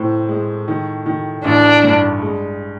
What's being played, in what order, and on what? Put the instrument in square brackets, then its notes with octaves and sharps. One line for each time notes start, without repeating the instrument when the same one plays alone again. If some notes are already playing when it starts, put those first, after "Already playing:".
Already playing: [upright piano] A2 C4
G#3
D#3
D#3
[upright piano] A1 [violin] D4
[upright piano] G2
G#3